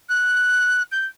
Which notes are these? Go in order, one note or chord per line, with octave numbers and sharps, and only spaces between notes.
F#6
G6